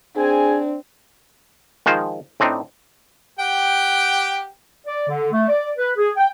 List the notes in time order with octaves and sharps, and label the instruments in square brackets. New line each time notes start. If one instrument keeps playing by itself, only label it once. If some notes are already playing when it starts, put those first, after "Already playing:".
[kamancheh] C4 [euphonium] D4 [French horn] G#4 [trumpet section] G#5
[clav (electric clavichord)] D#3 F3 G#3 F4 C5
A2 C4 D4 D#4
[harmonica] G4 F#5 G5
[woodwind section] D5
D3
A3
D5
B4
G#4
G5